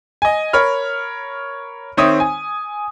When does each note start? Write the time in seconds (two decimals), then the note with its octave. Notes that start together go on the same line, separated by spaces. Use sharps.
0.22 D#5 G#5
0.53 A#4 C#5 B5 F6
1.97 D#3 C4 C#5 E5 D#6
2.20 G#5